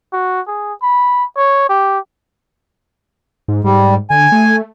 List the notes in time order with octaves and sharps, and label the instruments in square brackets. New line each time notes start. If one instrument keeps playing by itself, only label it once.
[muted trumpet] F#4
G#4
B5
C#5
G4
[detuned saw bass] G#2
[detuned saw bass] G#2 [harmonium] G3
[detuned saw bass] D3 [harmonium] G#5
[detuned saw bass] A3